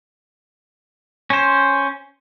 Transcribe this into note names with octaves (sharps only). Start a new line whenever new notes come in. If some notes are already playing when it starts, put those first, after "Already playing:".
C#4 C5